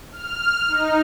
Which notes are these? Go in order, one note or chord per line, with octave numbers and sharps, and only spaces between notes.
F6
D#4